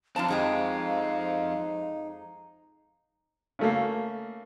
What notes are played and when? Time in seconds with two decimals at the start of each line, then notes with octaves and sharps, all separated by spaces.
0.16 F#2 F3 C4 D4 F5 A5
0.28 F2 G#3 D#4 G4
3.59 C#3 A3 A#3